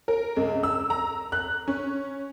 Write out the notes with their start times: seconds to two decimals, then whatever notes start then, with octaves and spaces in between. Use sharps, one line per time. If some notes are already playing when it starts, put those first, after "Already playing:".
0.08 A#4
0.37 C#2
0.63 E6
0.90 A#5
1.32 F#6
1.68 C#4